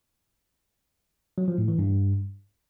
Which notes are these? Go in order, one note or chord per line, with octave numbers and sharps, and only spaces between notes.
F#3
F3
A2
E3
G2